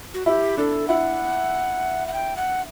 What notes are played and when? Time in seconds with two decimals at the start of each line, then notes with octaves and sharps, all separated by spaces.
0.14 F#4
0.26 E4 G4
0.57 D4 A4
0.88 E4 F#5
2.08 F#5
2.13 G5
2.37 F#5